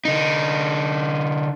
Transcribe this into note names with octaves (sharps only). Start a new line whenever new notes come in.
D3 D#4